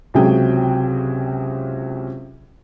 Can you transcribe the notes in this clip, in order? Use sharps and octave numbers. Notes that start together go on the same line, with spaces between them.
C#2 C3 F#3 G#4 G5